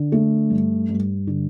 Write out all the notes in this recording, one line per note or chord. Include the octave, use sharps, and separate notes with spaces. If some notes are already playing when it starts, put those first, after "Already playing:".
Already playing: D3
A3
G2
G2
D3